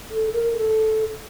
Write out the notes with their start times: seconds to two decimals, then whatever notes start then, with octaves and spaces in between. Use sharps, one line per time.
0.11 A4
0.33 A#4
0.54 A4